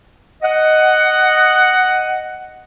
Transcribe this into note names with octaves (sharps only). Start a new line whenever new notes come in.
D#5 F#5